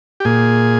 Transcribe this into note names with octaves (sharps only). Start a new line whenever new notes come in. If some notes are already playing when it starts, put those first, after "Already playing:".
G4
A#2 G#4